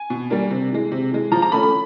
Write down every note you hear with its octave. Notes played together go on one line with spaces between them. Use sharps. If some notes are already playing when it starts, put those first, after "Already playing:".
Already playing: G#5
B2
G3 A#3 D4
C3
E3 G#3
C3
E3 G#3
F3 A#5
A#5
A3 C#4 B5
B5